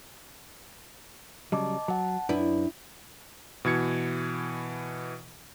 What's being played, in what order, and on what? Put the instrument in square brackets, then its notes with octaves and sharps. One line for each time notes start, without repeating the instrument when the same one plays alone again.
[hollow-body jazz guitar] C#3 F#3 G3 [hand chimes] D#5 A5 D6
[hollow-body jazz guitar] F#3 [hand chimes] F#5 A5
[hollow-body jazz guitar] F#2 B4 D5 [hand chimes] D4 [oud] E4
[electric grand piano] B2 E3 G#6 C#7